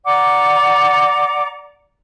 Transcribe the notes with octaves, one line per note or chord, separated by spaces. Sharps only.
D5 F#5 A#5 D6